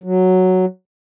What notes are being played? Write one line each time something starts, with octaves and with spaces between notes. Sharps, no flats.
F#3